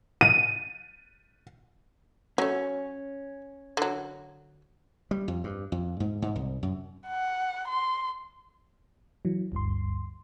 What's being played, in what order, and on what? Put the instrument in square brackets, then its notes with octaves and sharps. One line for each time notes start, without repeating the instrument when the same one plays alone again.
[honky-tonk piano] D#7
[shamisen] F#3 A3 [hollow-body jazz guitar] C#4
[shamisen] D3 F#3
[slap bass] G3
F2
G2
F2
G#2
G#2
C2
F#2
[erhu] F#5
C6
[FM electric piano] E3 F#3
G1 D2 G2 C6